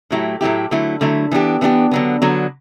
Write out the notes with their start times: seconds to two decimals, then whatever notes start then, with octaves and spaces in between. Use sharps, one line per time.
0.11 A2 F#3 A3 E4 G4
0.41 A2 F#3 A3 E4 G4
0.71 D3 F#3 A3 E4
1.01 D3 F#3 A3 E4
1.31 E3 B3 D4 G4
1.61 E3 B3 D4 G4
1.91 D3 F#3 B3
2.22 D3 F#3 B3